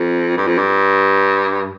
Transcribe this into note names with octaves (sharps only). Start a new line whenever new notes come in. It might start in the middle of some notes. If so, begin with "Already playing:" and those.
Already playing: F2
G2
F2
G2